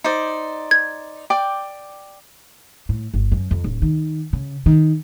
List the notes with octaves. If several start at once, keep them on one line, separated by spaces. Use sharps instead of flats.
D#4 C5 D5
G#6
D5 G5 D6
A2
G1
F#2
F2
D1
D#3
C#3
D#3